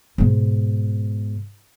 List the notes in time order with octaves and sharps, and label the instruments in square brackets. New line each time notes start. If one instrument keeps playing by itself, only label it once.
[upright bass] G#2 B2